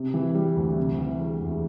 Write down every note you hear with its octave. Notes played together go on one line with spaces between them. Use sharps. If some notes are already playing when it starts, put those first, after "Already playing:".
Already playing: C3
E3
G3
D2
C3
E3
G#3
E2